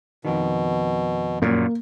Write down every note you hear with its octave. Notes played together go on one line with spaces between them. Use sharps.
F2 B2 D#3
F#2 A#2 A#3